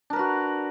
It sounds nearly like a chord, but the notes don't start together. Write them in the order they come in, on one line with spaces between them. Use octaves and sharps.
D4 A#4 B4 F#4